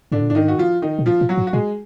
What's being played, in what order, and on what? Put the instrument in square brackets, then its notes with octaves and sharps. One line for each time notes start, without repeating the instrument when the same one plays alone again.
[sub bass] G#2 [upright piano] D3 D4
[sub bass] A#2
[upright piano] D4
[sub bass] G#2 [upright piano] D#3 D#4
[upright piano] F#4
F3 F4
D#3 D#4
[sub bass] B2
[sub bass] A#2 [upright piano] F3 F4
[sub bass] A#2
[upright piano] F#3 F#4
[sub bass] G#2
[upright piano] F#4
[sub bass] A#2 [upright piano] G#3 G#4